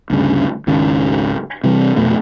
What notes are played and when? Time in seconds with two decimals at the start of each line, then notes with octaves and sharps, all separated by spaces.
0.10 D2 G2 C#3
0.67 G#1 C#2 D#3 C#4
1.64 C3 E3 G3
1.97 F1 F2 B2 A3